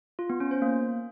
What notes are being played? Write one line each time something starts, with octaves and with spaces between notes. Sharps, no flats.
F4
B3
C#4
C5
A#3